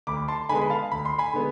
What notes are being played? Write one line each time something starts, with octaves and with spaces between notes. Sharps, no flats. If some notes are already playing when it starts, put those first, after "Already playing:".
D2 B5 D6
A5 C6
D3 G#3 B3 G#5 B5
B5
F5 A5
D2 B5
C6
G#5 B5
D3 G#3 B3